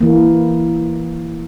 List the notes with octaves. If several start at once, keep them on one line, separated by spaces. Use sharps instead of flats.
E3 A#3